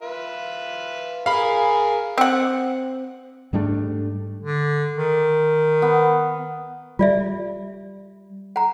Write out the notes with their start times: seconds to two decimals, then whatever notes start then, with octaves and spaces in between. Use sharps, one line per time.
0.02 F4 B4 E5
1.26 G#4 A#4 F5 G#5 B5
2.18 C4 F#5
3.53 G#2 G3 A3 D4
4.43 D3
4.96 D#3
5.82 B3
6.99 G3 F4 D5 E5
8.56 F#5 A#5